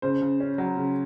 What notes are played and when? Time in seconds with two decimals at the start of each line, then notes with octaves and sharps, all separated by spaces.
0.02 C#3 C5
0.21 C#3
0.40 C#4
0.58 F#3
0.77 C#3